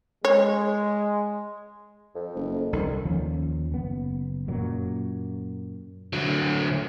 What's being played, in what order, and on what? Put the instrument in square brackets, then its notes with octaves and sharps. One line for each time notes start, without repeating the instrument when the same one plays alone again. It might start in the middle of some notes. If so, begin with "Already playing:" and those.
[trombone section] G#3 [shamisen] C#5
[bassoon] F2
[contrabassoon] F#1
[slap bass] C2 [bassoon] D3 [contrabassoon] D#3
[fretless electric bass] D#2 F3 C#4
F#1 B3
F#2 A#2 F#3
[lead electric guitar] D3 F#3